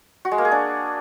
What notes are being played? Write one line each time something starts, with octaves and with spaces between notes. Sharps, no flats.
F#4
G#3
A#3
G#4
D4